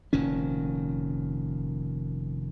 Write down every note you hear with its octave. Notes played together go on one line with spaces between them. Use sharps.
F1 A#2 D#3 C#4